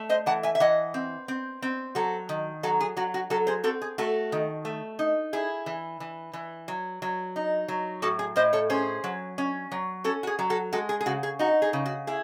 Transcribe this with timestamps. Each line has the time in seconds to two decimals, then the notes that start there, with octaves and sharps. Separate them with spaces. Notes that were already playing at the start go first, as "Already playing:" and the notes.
Already playing: A3
0.09 C5 D#5
0.26 E3 F#5 A5
0.43 E5 G#5
0.55 E5
0.60 E3 D#5 F#5
0.94 C4
1.28 C4
1.62 C4
1.95 F#3 F#4 A4
2.29 D#3
2.63 F#3 F#4 A4
2.80 G#4
2.97 F#3 F#4
3.14 F#4
3.30 F#3 F#4 A4
3.47 G#4 C5
3.64 C4 F#4 A4
3.82 G#4
3.98 A3 F#4 A4
4.32 D#3
4.65 A3
4.99 D#4
5.33 E4 G#4
5.66 E3
6.00 E3
6.33 E3
6.68 F#3
7.02 F#3
7.36 D#4
7.68 F#3
8.02 A2 F#4 A4
8.19 G#4
8.36 A2 C5 D#5
8.53 A4 C#5
8.70 C#4 G#4 C5
9.04 F#3
9.38 C#4
9.72 F#3
10.04 C#4 F#4 A4
10.23 F#4
10.27 G#4
10.39 F#3
10.50 F#4 A4
10.73 G#3 F#4 A4
10.89 G#4
11.01 G#4
11.06 C#3 F#4
11.23 G#4
11.39 D#4 F#4
11.62 G#4
11.73 C#3
11.86 F#4
12.07 E4 G#4